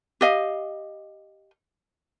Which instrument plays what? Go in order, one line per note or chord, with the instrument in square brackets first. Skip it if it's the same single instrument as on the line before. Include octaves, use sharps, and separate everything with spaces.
[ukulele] G4 D#5 F5